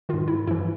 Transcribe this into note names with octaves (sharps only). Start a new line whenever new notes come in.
G#2 D#3 F4
E4
G2 E3 E4